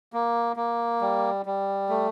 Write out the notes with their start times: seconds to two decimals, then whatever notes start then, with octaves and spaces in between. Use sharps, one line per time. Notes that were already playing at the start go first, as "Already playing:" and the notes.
0.13 A#3
0.56 A#3
1.01 G3
1.46 G3
1.89 A3